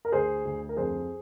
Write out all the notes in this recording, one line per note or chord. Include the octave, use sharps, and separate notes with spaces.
A#4
D2 G#4 C5
D2
A#4
F2 G#4 C5